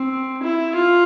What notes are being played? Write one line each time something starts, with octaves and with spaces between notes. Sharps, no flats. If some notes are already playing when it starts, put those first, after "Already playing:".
Already playing: C4
E4
F4